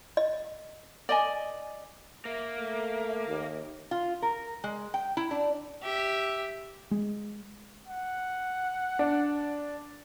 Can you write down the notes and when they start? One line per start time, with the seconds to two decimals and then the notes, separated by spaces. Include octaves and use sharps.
0.17 D#5
1.09 D5 D#5 G#5
2.25 A#3 E5
2.59 A3
3.28 D#2
3.91 F4
4.22 A#4
4.64 G#3
4.94 G5
5.17 E4
5.31 D4
5.82 G4 E5
6.91 G#3
7.88 F#5
8.99 D4